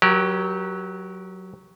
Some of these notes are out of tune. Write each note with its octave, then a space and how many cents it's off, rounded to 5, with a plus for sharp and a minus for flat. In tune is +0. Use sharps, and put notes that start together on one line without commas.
F#3 +0 G4 -20 A#4 +35